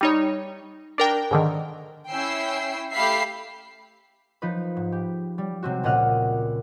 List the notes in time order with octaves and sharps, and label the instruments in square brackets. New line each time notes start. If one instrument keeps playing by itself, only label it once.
[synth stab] G3 D#4 C#5
D4 A#4 G5
G#2 D3 D#3
[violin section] C#4 E4 G5 E6 C7
A3 G4 E5 F5 B5 C7
[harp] F3 D#4 B4
G#2
G4
G3
C3 G#3 C4 F#4
C#2 A#2 D#5 F#5 F6